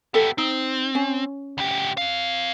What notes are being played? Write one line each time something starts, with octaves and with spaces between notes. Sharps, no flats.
B3 G4 A4 E5
C4 D#4
C#4
D2 G4
C4 F5